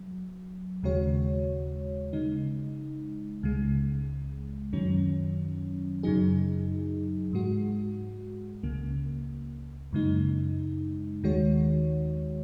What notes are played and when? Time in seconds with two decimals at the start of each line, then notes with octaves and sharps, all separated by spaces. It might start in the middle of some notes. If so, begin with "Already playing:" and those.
Already playing: F#3
0.83 D#2 C#3 G#3 F#4 C#5
2.13 C#3 G#3 D#4
3.43 C#2 C#3 G#3
4.73 F#2 D#3 F#3 C#4
6.03 F#2 C#3 F#3 D#4 G#4
7.33 G#2 G#3 F#4
8.63 C#2 C#3 A#3
9.93 F#2 C#3 G#3 D#4
11.23 D#2 D#3 G#3 F#4 C#5